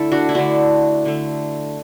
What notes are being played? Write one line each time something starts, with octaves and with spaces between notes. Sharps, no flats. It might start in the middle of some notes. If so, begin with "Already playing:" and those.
Already playing: D3 A3 E4 A4
D4 F#4
E4
D3 A3 D4 F#4
D3 A3